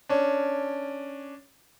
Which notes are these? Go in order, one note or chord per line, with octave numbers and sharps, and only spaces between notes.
C#4 D4